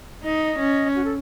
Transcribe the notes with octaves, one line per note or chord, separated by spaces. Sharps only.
D#4 D#5
C#4
F#4
A4